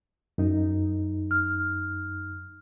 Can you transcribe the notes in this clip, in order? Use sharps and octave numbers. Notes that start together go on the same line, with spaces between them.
F#2 D#4
F6